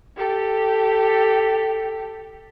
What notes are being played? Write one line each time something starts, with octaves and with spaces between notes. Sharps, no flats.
G4 A4